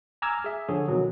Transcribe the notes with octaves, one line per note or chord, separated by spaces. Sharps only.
G#5 A#5 D6 E6 F6 G#6
G#4 E5
D3 F3 G#4 A4 C#5
B2 D#3 E3 F#3